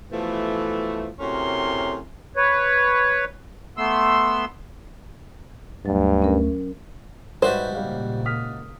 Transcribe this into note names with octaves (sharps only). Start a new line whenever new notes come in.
B2 E3 F3 A3
A2 C3 C#4 F#4 A#4 C6
B4 C#5
A3 B3 C6 E6
D2 G2 F#3 A3
C#4 A#4
G#2 G3 F#4 G4 B4 C5 D5 E5
A#2 C#3 G3 A#3 F5
D#6 F6 B6